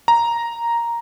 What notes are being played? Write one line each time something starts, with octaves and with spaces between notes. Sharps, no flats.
A#5